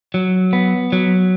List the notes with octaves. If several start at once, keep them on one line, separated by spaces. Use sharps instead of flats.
F#3
B3
F#3